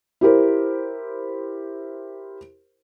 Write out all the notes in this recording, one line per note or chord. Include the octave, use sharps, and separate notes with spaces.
E4 G4 A#4 C5